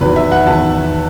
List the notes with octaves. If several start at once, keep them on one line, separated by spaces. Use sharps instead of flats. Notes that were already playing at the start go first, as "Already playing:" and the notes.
E2 D#3 F#3 B4
E5
F#5
E2 D#3 F#3 A5